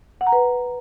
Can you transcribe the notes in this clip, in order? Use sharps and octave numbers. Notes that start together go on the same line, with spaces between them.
F#5
A#5
B4